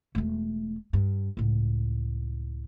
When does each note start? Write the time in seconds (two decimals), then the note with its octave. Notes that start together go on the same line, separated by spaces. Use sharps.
0.15 E1 A3
0.93 G2
1.37 C#2 A2